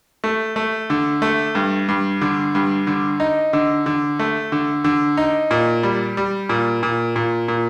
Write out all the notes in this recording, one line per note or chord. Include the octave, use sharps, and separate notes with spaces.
A3
A3
D3
A3
G2
G2
D3
G2
D3
D#4
D3
D3
A3
D3
D3
D#4
A#2
G3
G3
A#2
A#2
A#2
A#2